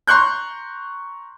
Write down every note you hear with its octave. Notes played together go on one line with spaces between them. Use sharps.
A#5 C6 C#6 F#6 G6